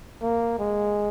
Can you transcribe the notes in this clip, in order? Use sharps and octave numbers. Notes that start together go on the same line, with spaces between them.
A#3
G#3